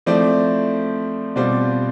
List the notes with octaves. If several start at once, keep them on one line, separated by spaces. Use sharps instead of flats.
F3 A3 C4 E4 C5 D5
B2 G3 C4 F4 C5 D5